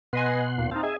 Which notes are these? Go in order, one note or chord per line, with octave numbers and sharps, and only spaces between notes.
B2 B4 D#5 F#5 G#5 C6
D#2 A#2
C4 D#4 F5 A5
G#4 D#5 E5 G#5